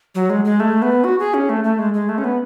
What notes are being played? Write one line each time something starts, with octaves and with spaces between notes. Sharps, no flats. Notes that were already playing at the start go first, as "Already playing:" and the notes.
F#3
G#3
G#3
A3
B3
F#4
G#4
C#4
A3
A3
G#3
G#3
A3
C#4
B3